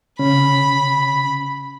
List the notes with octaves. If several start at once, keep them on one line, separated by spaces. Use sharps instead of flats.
C#3 C#4 B5